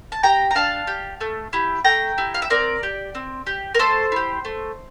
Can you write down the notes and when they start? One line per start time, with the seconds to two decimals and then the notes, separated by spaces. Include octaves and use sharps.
0.12 A5
0.23 G4 G5 A#5
0.51 A#5
0.55 D4 F5 A5
0.87 G4
1.21 A3
1.53 E4 G4
1.85 A3 G5 A#5
2.18 E4 G4
2.34 F5
2.42 E5
2.50 C4 A#4 D5
2.83 G4
3.15 C4
3.47 G4
3.75 A#4
3.79 A3 A4 C5
4.12 E4 G4
4.45 A3